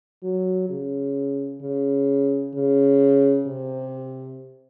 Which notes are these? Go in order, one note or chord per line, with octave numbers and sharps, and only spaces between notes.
F#3
C#3
C#3
C#3
C3